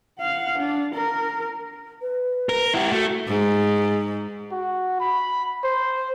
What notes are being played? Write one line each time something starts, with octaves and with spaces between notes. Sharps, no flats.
F5 F#5
D4
A#4
B4
A#4
E4 G4 F#5
A3 F#4
G#2
F#4
B5
C5